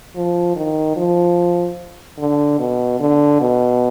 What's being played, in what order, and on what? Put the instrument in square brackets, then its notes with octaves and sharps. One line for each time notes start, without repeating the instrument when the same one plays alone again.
[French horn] F3
D#3
F3
D3
B2
D3
B2